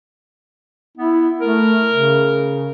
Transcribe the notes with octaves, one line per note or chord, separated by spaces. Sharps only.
B3 E4
A3 A#4
C#3